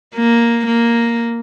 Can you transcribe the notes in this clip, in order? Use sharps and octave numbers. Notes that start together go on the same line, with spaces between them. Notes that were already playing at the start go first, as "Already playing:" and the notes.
A#3
A#3